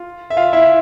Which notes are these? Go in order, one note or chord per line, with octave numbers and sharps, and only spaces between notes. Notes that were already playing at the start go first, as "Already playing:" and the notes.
Already playing: F4
E5
F4 F5
E4 E5